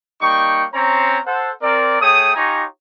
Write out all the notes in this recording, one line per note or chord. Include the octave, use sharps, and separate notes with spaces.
G3 A#3 D#4 G5 C#6
C4 C#4 C5 C#5 A#5
A4 C5 F#5
C4 A#4 D5
A3 G#4 C#5 G5 D#6
D#4 F4 G4 C#5 G#5 A#5